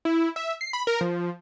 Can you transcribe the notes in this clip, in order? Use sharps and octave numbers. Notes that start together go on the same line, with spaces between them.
E4
E5
C7
B5
A#4
F3